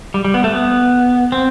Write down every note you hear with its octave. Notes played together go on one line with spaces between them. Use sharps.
G3
G3
B3
A3
B3
C4